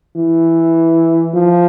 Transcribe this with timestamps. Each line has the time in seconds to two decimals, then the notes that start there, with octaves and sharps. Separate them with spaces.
0.17 E3
1.34 F3